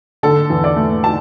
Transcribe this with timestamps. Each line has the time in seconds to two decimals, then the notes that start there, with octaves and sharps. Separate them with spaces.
0.23 D3 A4
0.50 E2
0.64 D5
0.76 A3
1.04 A5